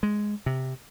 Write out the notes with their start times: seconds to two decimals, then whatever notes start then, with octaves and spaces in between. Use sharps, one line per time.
0.03 G#3
0.46 C3